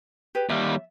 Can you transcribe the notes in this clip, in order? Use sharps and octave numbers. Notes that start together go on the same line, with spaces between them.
G4 G#4 B4
D#2 G3 E5